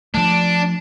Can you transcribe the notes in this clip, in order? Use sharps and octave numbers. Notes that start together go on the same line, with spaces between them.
F3 A3 D4